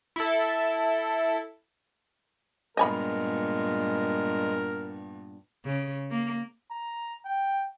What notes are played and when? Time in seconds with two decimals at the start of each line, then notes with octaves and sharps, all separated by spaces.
0.16 E4 A4
2.77 G2 A#2 G#3 B3 A#4 D#5 G#5 B5
5.65 C#3
6.11 A#3
6.71 A#5
7.26 G5